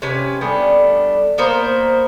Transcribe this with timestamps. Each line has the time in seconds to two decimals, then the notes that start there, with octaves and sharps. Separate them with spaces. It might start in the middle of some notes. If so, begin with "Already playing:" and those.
0.02 C3 C#4 B4 G#5
0.41 G3 A3 B3 D4
1.38 A#3 B3 A#4 C5